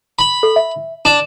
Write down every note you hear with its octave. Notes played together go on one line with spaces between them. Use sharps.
B5
A4
E5
D4 E7